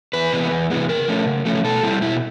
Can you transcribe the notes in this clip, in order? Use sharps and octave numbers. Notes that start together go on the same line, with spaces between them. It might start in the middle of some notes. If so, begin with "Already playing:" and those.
E2 B4
C3 E3 G#3 B3
E2
C3 E3 G#3 B3
C#3 A#4
F3 A3 C#4
C#3
F3 A3 C#4
B2 A4
G3 C4 E4
B2 E4